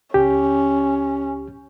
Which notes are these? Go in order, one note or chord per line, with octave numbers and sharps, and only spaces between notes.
C#2 C#4 G4